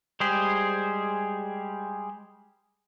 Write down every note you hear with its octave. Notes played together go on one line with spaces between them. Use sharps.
G3 G#3 G4 G#4 C5